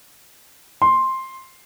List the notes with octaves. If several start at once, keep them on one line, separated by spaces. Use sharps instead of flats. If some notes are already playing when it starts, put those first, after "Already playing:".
C6